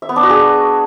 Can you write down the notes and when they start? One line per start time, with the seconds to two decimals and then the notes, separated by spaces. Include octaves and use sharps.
0.02 E5
0.09 B3
0.16 D4
0.23 F#4
0.30 G#4